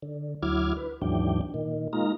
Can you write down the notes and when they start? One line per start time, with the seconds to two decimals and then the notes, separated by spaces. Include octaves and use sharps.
0.02 D3
0.43 D2 F#3 E4 D6 F6 G#6
0.77 B4
1.02 D#2 G#2 E3 F#3 D4 G5
1.54 A#2 D#3
1.93 G#3 A#3 D#4 F4 A#5